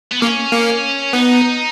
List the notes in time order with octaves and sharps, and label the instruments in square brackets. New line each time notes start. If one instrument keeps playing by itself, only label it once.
[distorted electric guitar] B3
[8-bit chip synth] A#3 [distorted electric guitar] C#4
[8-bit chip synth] A#3
[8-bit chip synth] B3 [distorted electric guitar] D#4